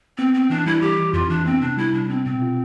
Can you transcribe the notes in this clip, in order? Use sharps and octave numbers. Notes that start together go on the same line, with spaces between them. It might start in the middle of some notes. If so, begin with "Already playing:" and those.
B3 C4
B3 C4
E3 D4
G3 E4
E3 G4
E3
F2 F4
E3 D4
B3 C4
C3 D4
G3 E4
C3 D4
B3 C4
B2 C4
F4